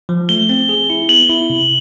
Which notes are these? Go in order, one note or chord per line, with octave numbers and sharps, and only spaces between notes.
F3
A3 G7
C4
G#4
E4
B3 F#7
E4
C3